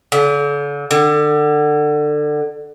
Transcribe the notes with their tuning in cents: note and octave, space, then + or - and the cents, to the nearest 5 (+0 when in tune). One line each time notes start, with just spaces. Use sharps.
D3 -40
D3 +25